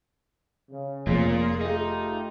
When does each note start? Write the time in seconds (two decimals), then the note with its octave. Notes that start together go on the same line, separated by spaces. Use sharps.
0.70 C#3
1.07 F1 A#3 F4 G#4
1.61 A3 D#4 F4 G4